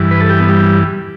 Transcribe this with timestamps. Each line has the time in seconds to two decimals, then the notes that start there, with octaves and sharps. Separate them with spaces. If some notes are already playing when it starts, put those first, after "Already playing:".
Already playing: G2 E3
0.11 B4
0.20 A4
0.30 G4
0.40 B3
0.49 G3